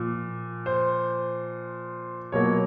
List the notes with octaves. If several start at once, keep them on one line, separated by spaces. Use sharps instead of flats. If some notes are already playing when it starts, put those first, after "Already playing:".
Already playing: A#2 F3
C5
B2 F#3 A#3 C#5